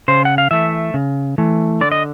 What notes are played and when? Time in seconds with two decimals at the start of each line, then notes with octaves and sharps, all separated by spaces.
0.08 C#3 C5
0.25 F#5
0.38 F5
0.51 E3 A3 E5
0.94 C#3
1.38 E3 A3
1.81 D3 D5
1.92 D#5